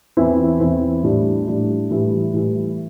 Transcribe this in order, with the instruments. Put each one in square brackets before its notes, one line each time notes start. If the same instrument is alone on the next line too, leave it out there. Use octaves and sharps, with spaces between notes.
[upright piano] E2 E3 C4 E4
E2 E3 C4 E4
A2 G3 D4
A2 G3 D4
A2 E3 G3 E4
A2 E3 G3 E4